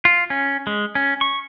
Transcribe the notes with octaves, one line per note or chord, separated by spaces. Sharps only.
F4
C#4
G#3
C#4
C#6